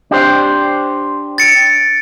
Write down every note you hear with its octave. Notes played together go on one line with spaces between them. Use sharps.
D4 G4 C5
A6 C#7 D7